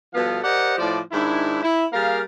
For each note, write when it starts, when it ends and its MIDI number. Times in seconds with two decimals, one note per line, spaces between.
0.14 0.42 47
0.14 0.42 53
0.14 0.42 55
0.14 0.42 59
0.14 0.42 69
0.14 0.42 77
0.43 0.75 67
0.43 0.75 70
0.43 0.75 72
0.43 0.75 74
0.43 0.75 75
0.43 0.75 78
0.78 0.99 45
0.78 0.99 53
0.78 0.99 74
1.11 1.58 44
1.11 1.58 51
1.11 1.58 62
1.11 1.58 64
1.63 1.86 64
1.93 2.21 55
1.93 2.21 58
1.93 2.21 68
1.93 2.21 70
1.93 2.21 77